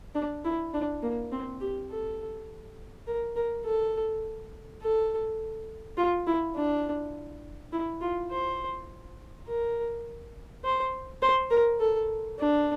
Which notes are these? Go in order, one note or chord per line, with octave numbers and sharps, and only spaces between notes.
D4
E4
D4
A#3
C4
G4
A4
A#4
A#4
A4
A4
F4
E4
D4
E4
F4
C5
A#4
C5
C5
A#4
A4
D4